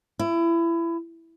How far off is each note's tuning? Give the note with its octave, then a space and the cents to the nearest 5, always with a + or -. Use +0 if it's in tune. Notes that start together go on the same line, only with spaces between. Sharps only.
E4 +25